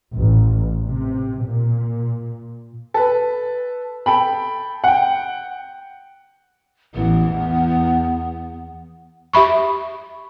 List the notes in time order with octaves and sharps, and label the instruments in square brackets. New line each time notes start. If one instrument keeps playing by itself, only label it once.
[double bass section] A1
C3
A#2
[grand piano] A4 B4
A4 G5 B5
F#5 G5
[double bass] A1 E3 [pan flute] B3
[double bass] E2
[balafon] G4 E5 B5 C#6